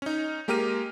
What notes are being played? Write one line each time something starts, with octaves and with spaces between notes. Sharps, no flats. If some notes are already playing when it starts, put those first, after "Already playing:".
C#4 D#4
G#3 A#3 G4 A#4 F6 D#7